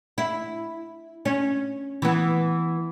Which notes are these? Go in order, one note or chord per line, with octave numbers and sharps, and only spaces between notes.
E4
C#4
E3 B3